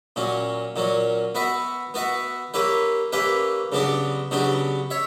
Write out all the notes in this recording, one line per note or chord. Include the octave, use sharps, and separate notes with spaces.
A#2 F#3 C#4
A#2 F#3 C#4
B3 F#4 B4 E5
B3 F#4 B4 E5
A#3 C#4 G4 B4 E5
A#3 C#4 G4 B4 E5
C#3 F#3 B3 D4 G4
C#3 F#3 B3 D4 G4
C#5 E5